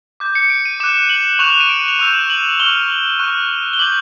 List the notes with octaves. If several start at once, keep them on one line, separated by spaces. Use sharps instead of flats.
D6 G6
C#7
D7
D#7
D6 F#6 E7
F#7
C#6 F#6 F7
E7
D#7
D7
F7
C#6 E6 G6 E7
F#7
C#6 F6 G7
C#6 F#6
G7
D6 G6 F#7